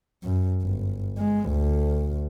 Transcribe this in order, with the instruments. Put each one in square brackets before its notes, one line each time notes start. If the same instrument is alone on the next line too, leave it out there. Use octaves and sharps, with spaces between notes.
[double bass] F#2
G1
G#3
D2